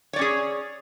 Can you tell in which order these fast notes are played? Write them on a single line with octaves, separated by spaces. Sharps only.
C#5 D5 C#4 G#4